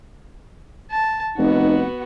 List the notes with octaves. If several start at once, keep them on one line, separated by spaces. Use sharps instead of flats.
A5
F1 B3 D#4 F#4